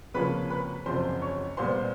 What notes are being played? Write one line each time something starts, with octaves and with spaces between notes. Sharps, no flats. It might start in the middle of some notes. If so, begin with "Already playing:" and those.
C#2 C3 F3 A#3 C#4 B4 B5
B4 B5
F#1 E2 C3 F3 C5 C6
C#5 C#6
C2 A#2 G3 B3 C5 C6